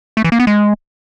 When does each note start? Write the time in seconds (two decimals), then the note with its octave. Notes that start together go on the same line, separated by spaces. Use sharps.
0.17 A3
0.24 E3
0.32 A#3
0.40 B3
0.47 G#3